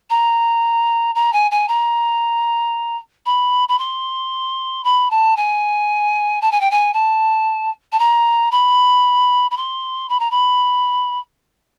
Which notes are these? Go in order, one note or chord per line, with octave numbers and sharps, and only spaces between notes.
A#5
A#5
G#5
G#5
A#5
B5
B5
C6
B5
A5
G#5
A5
G#5
G5
G#5
A5
A5
A#5
B5
B5
C6
B5
A#5
B5